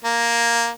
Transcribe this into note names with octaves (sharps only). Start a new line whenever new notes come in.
A#3